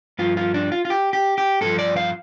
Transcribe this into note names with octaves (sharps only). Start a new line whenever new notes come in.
G2 F3 F4
F4
D4
F4
F4
G4
G4
G4
G2 F3 A4
D5
F5